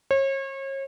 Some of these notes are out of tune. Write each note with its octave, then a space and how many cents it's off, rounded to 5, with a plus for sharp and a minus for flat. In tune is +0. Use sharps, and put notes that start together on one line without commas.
C#5 -35